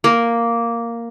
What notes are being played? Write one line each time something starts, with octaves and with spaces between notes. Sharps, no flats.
A#3